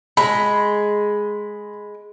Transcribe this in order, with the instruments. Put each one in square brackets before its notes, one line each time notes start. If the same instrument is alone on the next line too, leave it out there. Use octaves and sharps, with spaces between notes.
[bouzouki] G#3 [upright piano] B5